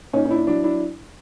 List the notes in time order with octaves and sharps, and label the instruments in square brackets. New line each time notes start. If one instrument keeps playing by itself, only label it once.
[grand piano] A#2 C#4 D#4
D#4
D4 E4
F#3 D4 E4
D4 E4